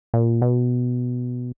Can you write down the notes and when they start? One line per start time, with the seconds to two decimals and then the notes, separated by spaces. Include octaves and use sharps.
0.14 A#2
0.42 B2